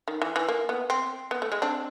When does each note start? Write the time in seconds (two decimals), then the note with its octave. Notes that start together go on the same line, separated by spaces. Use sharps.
0.08 D#3
0.22 E3
0.36 E3
0.48 A#3
0.69 B3
0.90 C4
1.31 B3
1.42 A3
1.52 G#3
1.62 C4 D4